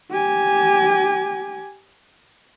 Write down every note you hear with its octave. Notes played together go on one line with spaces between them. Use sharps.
G4 G#5